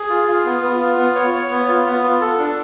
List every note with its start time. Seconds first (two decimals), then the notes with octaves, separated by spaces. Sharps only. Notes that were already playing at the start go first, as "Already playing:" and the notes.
Already playing: G#4
0.09 F4
0.28 F4
0.45 B3
0.63 B3
0.80 F4
0.98 B3
1.15 C#5
1.34 C#5
1.51 B3
1.69 F4
1.86 B3
2.03 F4
2.21 A4
2.39 D4